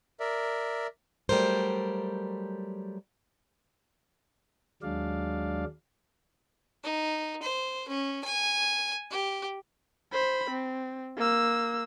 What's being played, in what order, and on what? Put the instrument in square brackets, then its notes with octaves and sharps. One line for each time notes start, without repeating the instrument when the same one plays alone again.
[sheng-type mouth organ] A#4 D5 E5
[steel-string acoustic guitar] F#3 G3 A3 A#4 C5
[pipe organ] D#2 F#3 G#3 D4 D5 F5
[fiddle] D#4
C5
C#4
G#5
G4
[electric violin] C5 B5
C4
A#3 E6